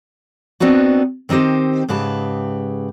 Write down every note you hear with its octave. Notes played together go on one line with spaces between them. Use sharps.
B3 C4 D4 D#4 F#4
D#3 C4 D#4 G4 C5
G#2 C#3 G4 B4 A5